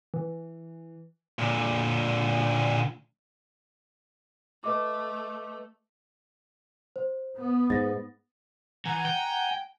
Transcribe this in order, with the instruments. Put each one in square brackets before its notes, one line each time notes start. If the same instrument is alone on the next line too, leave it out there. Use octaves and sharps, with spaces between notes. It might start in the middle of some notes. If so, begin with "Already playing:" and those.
[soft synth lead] E3
[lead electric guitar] A#2 D3
[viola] A3 [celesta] B4 D#5 D6
[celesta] C5
[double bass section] B3
[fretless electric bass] G#2 [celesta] A6 A#6
[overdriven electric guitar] E3 [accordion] F#5 G#5 A#5
[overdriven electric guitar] G5